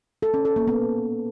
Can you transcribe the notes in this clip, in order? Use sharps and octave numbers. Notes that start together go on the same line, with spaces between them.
A4
C#4
A4
A#3
B3